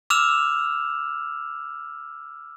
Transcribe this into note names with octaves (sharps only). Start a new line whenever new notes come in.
D6 E6 F6 E7 F7